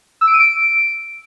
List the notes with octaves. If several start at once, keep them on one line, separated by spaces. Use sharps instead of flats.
E6
D7
D#7
D7